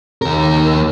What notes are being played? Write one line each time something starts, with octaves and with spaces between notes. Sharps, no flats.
D#2 A#4